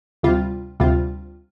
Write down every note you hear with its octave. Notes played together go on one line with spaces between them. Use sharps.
D2 C3 G3 F4
D2 C3 G3 F4